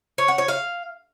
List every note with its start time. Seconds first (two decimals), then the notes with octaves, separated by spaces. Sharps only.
0.18 C#5
0.28 F#5
0.38 C#5
0.48 F5